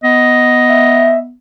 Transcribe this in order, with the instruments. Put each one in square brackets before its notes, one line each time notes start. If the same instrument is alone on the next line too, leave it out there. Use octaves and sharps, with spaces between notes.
[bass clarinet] B3 [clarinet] D#5
[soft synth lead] E5